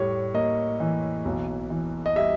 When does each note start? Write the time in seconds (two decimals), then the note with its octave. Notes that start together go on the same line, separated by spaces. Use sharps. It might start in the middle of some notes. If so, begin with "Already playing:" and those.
Already playing: A2 G3 C#5
0.34 A#3 D#5
0.80 E3
1.25 B1
1.70 E3
2.06 D#5
2.16 G3 E5